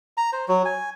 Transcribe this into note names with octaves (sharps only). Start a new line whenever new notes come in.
A#5
C5
F#3
G#5